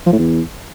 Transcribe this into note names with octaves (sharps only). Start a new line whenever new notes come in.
F3
A2
E2